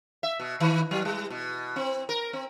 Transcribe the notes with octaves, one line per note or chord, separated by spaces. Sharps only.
E5
B2
D#3
F#3
G3
B2
C4
A#4
C4